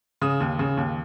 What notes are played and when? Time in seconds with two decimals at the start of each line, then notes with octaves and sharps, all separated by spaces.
0.22 C#3 D#6
0.40 D#2
0.59 C#3
0.77 D#2